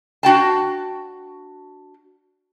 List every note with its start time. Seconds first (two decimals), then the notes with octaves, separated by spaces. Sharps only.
0.23 D4 F#4 G5 A5